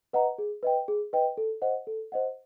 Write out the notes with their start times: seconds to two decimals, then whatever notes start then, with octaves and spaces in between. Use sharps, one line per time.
0.13 B4 D#5 F#5 A#5
0.38 G#4
0.63 B4 D#5 G5
0.88 G#4
1.13 B4 D#5 G5
1.37 A4
1.62 C5 D#5 F#5
1.87 A4
2.12 C5 D#5 F#5